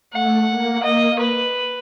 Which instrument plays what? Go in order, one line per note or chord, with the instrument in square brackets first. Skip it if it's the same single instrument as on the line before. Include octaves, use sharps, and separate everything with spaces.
[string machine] A3 [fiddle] F#5
[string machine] A#3
[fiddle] D#5
B4